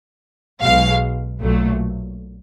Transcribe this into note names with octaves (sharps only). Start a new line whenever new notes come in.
B1 B2 G#3 F5
B1 A#2 F#3 A3